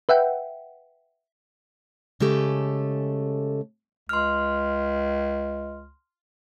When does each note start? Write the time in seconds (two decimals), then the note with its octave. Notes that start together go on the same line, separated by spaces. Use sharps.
0.09 B4 E5 F#5 G5
2.20 C#3 G#3 A3 G4 A4
4.09 C#2 C6 F6